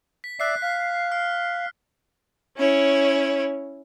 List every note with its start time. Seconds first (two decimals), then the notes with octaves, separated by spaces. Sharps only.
0.24 B6
0.40 D5 E5 F#6 C7
0.62 F5 B6
1.12 F6
2.57 C#4 E4 C#5